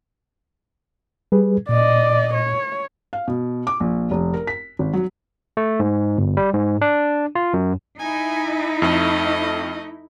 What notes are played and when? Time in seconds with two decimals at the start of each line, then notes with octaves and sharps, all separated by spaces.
1.32 G3 G#4 B4
1.69 A#2 D5 D#5
2.34 C#5
3.13 F5
3.28 B2
3.67 D6
3.80 A#1
4.11 F1
4.34 A#4
4.47 B6
4.79 G#1
4.93 F#3
5.57 A3
5.80 G#2
6.18 G1
6.37 G3
6.53 G#2
6.81 D4
7.35 F4
7.54 F#2
7.99 D#4 E4 G#5
8.82 F2 A3 D#5